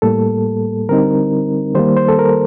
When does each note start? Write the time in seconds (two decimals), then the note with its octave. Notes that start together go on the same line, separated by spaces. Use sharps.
0.02 A2 G3 A#3 A4
0.89 D3 G3 C4 D#4 A#4
1.75 D#3 G3 A#3 C5
1.97 C5
2.08 A4
2.19 A#4